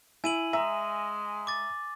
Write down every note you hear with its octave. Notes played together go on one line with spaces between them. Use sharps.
E4 G#5 D#7 F#7
G#3 E5 A#5 E6
D6 A6